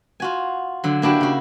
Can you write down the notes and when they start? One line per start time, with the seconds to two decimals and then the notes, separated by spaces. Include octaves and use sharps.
0.20 F4 F#4 G#5
0.84 D3 F#3
1.02 A#3 D4 E4 F#4 G4
1.21 C#3 F#4